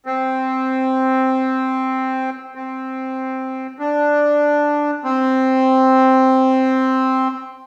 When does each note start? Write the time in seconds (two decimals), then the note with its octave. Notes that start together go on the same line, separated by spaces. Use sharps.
0.06 C4
2.55 C4
3.79 D4
5.04 C4